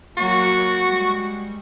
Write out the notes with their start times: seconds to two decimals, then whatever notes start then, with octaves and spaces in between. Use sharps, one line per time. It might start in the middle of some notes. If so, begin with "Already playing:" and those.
0.17 F#3 A#3 F#4 C#5 F#5 C#6
0.86 G3 G#3